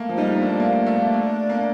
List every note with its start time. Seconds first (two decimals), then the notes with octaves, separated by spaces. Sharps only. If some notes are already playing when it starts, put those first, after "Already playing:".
Already playing: A3 A#3
0.09 F3
0.18 G3 D#4
0.36 A#3
0.41 A3 D4
0.60 A#3
0.86 A3
0.96 A#3
1.14 A3
1.49 A#3